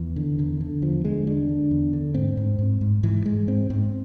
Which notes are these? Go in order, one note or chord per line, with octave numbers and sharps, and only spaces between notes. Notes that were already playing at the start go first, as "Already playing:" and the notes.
Already playing: E2 E3
D3
E2 D3
D3
E2 F3
D3 G#3
E2 D4
D3
E2
D3
G#2 C4
G#2
G#2
G#2
G#2 E3
G#2 G#3
G#2 C4
G#2 C4